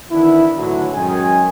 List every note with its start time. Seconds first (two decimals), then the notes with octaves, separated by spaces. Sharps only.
0.11 D#3 E3 B3 D4 E4
0.56 A2 D3 E3 F#3
0.93 F#2 D#3 G#3 G#5